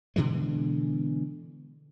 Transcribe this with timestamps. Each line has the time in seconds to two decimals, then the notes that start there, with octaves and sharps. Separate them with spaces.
0.16 B2 D3 E3 G#3